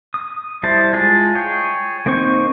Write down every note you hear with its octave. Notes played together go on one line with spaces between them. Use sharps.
D#6
G3 E4 C5 A5
G#3 F4 G#4 A5
G#4 C#5 G5
A#3 C4 D#4 C5 C#6